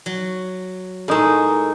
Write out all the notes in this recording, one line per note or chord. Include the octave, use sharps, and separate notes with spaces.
F#3
A2 G#3 D#4 A4 A#4